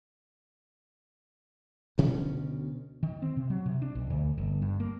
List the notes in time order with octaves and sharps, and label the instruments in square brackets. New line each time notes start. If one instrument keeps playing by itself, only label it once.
[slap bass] D2 B2 D3 C#4
[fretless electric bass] D#3
C4
C3
F#3
C3
D4
B1
D2
G1
G2
A#3